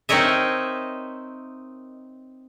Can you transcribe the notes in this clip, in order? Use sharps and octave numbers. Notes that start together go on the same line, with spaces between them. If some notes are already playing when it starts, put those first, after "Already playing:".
C4 D#4 A#4 C#5 D#5 E5